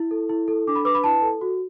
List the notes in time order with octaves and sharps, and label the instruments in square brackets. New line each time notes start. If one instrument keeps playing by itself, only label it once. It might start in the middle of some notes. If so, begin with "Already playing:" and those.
Already playing: [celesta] E4
A4
E4
A4
D4 D6
B5
B4 D6
B5
E4 A5
A4
F#4